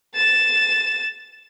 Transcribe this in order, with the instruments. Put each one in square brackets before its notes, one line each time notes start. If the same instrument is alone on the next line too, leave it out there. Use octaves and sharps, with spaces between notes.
[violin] A6 E7